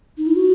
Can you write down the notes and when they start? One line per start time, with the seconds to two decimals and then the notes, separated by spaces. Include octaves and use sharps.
0.18 D#4
0.27 E4
0.36 F#4